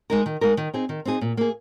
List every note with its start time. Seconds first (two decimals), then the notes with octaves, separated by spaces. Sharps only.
0.10 G#3 D#4 A#4
0.26 D#3
0.41 G#3 D#4 A#4
0.57 D#3
0.74 C4 D#4 G#4
0.89 D#3
1.05 C4 D#4 G#4
1.21 A#2
1.37 A#3 G#4